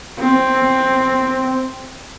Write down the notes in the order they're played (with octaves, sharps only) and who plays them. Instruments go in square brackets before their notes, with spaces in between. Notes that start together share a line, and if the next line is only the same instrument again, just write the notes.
[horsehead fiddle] C4